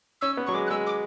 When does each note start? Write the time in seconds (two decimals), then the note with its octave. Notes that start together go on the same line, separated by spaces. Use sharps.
0.21 C#4 E6
0.37 B3
0.46 F#3 C#6
0.54 G#3 D6
0.67 F#6
0.70 G#3 E6
0.86 D6